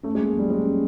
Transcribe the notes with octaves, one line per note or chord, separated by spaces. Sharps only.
A3 C#4
G#3
A#3
F#3 G3
F#3 G#3
C#4